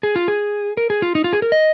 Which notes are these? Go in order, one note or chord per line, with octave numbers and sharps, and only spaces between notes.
G#4
F4
G#4
A#4
G#4
F4
D#4
F4
G#4
A#4
D#5